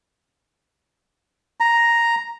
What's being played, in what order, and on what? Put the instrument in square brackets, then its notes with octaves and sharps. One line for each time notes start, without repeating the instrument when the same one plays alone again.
[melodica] A#5